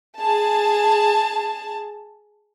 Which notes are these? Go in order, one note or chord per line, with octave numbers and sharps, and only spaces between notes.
G#4 A5